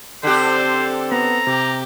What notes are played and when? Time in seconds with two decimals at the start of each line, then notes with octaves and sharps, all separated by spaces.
0.23 D3 C4 G4 A4 C5
1.12 B3 A#5
1.47 C3 G4